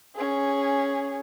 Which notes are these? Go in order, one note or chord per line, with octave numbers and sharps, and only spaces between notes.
C#4 G#4